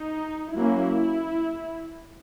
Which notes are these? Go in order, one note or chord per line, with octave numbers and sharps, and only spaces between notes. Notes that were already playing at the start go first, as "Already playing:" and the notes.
Already playing: D#4
F#3 A#3 C#4 E4